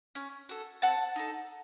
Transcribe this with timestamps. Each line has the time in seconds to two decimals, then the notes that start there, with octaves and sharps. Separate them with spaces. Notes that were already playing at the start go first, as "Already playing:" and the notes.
0.15 C#4
0.49 F#4 A4
0.82 C4 F#5 A5
1.16 D#4 A4